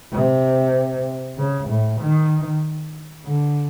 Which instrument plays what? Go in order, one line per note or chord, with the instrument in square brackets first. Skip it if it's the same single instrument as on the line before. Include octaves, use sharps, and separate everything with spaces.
[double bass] C3
C#3
A2
D#3
D3